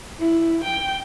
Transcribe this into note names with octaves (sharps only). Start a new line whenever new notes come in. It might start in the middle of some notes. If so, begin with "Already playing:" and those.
E4
G5